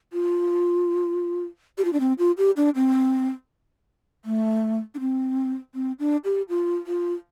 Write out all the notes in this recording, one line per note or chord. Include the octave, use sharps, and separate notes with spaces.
F4
G4
F4
D4
C4
F4
G4
D4
C4
A3
D4
C4
C4
D4
G4
F4
F4